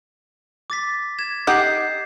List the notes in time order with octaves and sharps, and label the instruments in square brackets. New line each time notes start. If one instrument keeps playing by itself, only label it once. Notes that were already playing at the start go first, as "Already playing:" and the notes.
[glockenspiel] D6 A6 B6
G#6 E7
[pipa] D#4 G4 F#5 [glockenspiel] G6 C7